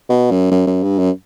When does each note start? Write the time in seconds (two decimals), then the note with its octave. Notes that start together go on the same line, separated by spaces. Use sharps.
0.10 B2
0.31 F#2
0.51 F#2
0.67 F#2
0.83 G2
0.99 F#2